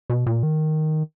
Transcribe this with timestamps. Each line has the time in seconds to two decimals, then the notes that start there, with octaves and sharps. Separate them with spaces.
0.10 B2
0.26 A#2
0.43 D#3